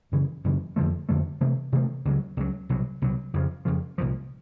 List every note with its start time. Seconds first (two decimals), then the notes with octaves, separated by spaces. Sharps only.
0.12 F#2 C#3 E3
0.44 F#2 C#3 E3
0.76 F2 D3 F3 A3
1.09 F2 D3 F3 A3
1.41 C3 E3 A3 C4
1.72 C3 E3 A3 C4
2.05 C#2 C#3 F#3
2.37 C#2 C#3 F#3
2.69 C2 B2 F#3
3.02 C2 B2 F#3
3.34 F2 C#3 F3
3.65 F2 C#3 F3
3.98 C2 A#2 F3